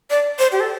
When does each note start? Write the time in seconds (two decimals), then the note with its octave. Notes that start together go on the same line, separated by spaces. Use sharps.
0.10 D5
0.39 C5
0.52 G4
0.60 A4